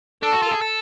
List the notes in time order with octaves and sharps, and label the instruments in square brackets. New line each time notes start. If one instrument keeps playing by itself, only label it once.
[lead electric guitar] D4 [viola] A4
[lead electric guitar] F#4
F4
G#4
A4